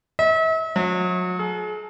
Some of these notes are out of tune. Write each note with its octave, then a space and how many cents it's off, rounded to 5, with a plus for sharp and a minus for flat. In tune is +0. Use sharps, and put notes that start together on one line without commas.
E5 -40
F#3 -35
G#4 +40